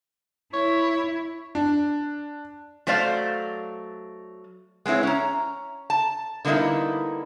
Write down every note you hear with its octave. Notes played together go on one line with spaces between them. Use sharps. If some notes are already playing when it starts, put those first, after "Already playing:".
E4 C#5
D4
F#3 A3 C5 D5 F5
G#3 B3 C4 E4 C#5
C#4 A#5
A5
D3 G3 A#3 B3 D#4 E4